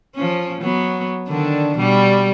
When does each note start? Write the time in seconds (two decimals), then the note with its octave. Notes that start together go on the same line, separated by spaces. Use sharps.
0.14 F3 C#4
0.61 F#3 B3
1.27 D3 D#3 D4
1.77 B2 G3